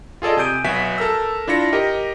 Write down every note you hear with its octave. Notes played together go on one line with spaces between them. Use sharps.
F4 G#4 A4 D5 D#5
C3 G#5 D#6 G6 D7 D#7
B1 B3 F#4 E5 G#5 B6
A4 A#4 E6
D4 E4 F4 A#6 C#7
G4 A#4 D#5